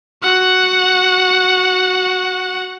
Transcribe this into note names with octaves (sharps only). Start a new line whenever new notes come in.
F#4 F#5